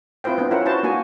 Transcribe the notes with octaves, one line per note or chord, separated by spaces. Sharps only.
C4 E4 F4 B4 C5 G5
B3 C4 D4
C#4 E4 F4 A#4 F#5
E4 F#4 B4 C5 A5
A#3 D4 F#4 G#5